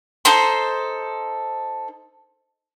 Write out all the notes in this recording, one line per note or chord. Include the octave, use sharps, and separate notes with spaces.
D#4 A4 C5 C6